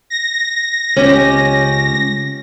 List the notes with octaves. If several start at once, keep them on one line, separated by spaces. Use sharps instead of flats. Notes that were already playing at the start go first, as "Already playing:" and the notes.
A#6
C#2 C#4 G4